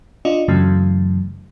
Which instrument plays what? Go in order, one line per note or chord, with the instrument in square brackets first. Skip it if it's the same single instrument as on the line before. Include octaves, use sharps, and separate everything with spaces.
[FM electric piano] D4 F4 D5 D#5
F#2 C#3 E3 F#3 A3